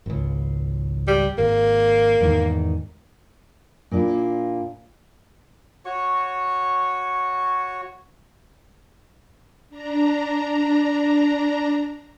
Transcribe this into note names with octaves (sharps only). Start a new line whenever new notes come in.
G#1 C#2
G3
G#1 A#3
E2 G#2 D#3
A#2 D4 E4
F#4 C#5 C#6
D4 A#5